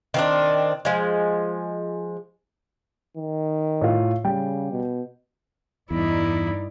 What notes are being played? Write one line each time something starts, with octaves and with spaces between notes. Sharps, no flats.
D#3 C4 D4
F3 G#3
D#3
A2 F4
C#3 G3 G5
B2
E2 G2 D#4 E4 D5